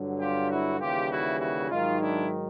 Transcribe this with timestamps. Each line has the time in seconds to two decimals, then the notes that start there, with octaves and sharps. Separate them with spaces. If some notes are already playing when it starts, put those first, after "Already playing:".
Already playing: G2 D3 F#3
0.20 F4 G4
0.50 E4 F#4
0.80 D#2 C#3 E3 G3 F4 G4
1.10 E4 F#4
1.40 E4 F#4
1.70 G#2 D#3 F#3 D#4 F4
2.00 D4 E4